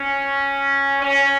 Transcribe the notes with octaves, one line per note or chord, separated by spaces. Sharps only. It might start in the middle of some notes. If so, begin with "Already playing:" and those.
Already playing: C#4
C#4